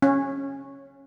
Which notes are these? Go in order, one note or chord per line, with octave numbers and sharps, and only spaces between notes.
C#4